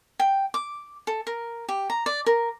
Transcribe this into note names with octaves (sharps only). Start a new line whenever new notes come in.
G5
D6
A4
A#4
G4
A#5
D5
A#4